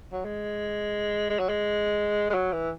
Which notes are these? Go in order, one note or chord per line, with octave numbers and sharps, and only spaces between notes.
F#3
G#3
G#3
F#3
G#3
G#3
F#3
E3